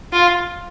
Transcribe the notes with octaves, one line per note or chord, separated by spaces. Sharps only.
F4